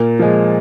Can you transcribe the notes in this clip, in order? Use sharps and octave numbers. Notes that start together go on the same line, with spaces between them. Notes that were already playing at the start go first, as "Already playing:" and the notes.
Already playing: A#2 A#4
F3 G#3